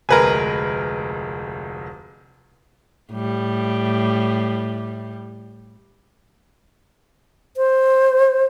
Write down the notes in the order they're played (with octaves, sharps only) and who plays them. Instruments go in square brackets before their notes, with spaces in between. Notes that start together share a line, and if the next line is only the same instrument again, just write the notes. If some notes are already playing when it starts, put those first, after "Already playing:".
[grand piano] F1 D2 G#3 [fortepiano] A#4 B4 G#5
[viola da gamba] A2 G3
[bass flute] C5